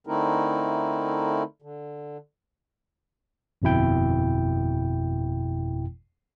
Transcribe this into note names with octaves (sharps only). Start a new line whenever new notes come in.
D3 A3 C4 D#4 E4 A#4
D3
G1 F2 B2 E4 G5